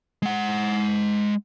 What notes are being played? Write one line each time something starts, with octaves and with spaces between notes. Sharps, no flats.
G#3 F#5